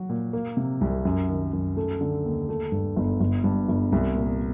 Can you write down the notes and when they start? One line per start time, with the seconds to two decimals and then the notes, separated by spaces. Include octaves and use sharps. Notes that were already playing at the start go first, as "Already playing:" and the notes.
Already playing: F#3 F#4
0.09 A#2
0.33 A#3
0.57 C3
0.81 C2
1.05 F#2
1.29 D#3
1.53 F#2
1.77 A3
2.01 D3
2.25 D#2
2.49 A3
2.72 G2
2.96 G1
3.20 G1
3.44 G2
3.68 G1
3.92 C2
4.15 A#2